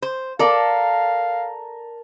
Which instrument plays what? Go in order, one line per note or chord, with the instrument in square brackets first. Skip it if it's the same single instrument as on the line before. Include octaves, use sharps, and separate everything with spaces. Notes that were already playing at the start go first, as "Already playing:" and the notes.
[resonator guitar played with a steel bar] C5
[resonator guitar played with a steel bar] A4 D5 [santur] A#4 A5 [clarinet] F5